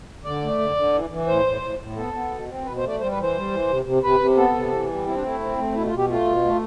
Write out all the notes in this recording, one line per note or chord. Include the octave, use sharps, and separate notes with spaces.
D3 D5
A3
D3
D3
E3
E3
A2 C5
A2
A2
A2
B3 A4
B3
B2
C4
B2 B4
C5
A3
D5
G3 C5
B4
E3
C5
G3
E3
C3
C3
C3 B4
C3
B3 A4
C3
E3
G3
C4 E4
D4
A3 E4
C4
A3
B2 E4
F4
B2
G4
A3 F4
B2
A3